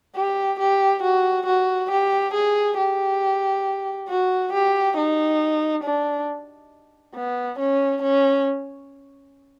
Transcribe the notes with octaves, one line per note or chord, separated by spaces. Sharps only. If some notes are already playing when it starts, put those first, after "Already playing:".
G4
G4
F#4
F#4
G4
G#4
G4
F#4
G4
D#4
D4
B3
C#4
C#4